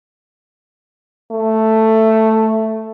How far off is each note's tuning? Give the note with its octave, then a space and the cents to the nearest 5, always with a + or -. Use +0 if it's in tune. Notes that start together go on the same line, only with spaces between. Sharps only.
A3 +5